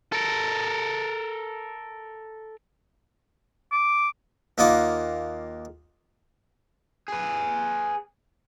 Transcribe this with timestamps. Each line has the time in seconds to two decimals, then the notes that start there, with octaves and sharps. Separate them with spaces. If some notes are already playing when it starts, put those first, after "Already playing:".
0.12 A4 A#4
3.72 D6
4.58 D#2 A#3 D#4 F4 F#5 D6
7.08 G#4 B4